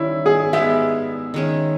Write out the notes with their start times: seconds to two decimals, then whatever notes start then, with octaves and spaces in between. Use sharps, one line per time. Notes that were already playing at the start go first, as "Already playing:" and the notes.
Already playing: D#3 G3 C#4 E4
0.26 G#4
0.53 G#3 B3 G4 A#4 E5
1.34 D#3 G#3 C#4